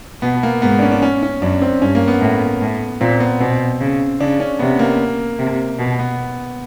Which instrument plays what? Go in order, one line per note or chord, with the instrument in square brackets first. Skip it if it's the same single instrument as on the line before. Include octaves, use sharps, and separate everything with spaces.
[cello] B2 [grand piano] B3
[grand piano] A#3
[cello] G#2 [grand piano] B3
[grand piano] D4
C#4
D4
C#4
C#4
[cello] F#2 [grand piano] D4
[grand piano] C4
[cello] G2 [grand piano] C#4
[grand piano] A#3
B3
[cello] A2
A2
[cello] A#2 [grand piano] C4
[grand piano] B3
[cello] B2 [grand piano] C4
[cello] C#3
[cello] C#3 [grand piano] D4
[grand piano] C#4
[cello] C3 [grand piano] B3
[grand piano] A#3
[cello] C3
B2
[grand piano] B3